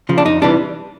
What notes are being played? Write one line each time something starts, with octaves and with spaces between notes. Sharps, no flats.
C#3 F3
D4
F2 D#4
C3 E3 G3 D4